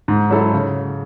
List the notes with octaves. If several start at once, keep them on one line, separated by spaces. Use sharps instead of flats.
G#2
F#3 C#4 E4 A4
C#3